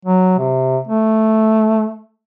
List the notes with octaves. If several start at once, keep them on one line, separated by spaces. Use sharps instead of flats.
F#3
C3
A3